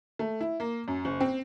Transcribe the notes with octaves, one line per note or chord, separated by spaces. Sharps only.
A3
E4
A#3
F#2
F#1
C4